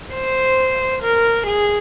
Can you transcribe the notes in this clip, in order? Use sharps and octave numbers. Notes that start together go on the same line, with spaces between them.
C5
A#4
G#4